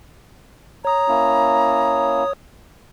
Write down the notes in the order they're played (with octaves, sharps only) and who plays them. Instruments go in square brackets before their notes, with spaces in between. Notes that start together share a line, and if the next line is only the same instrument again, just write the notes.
[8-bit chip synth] C#5 D#6 [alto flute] A#5
[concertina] A#3 C#4 E4